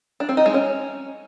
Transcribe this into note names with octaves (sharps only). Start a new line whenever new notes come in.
D4
C4
D#4
G#3
C#4